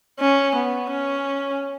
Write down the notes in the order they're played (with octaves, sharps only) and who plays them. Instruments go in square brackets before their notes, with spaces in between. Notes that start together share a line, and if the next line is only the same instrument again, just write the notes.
[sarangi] C#4
B3
C#4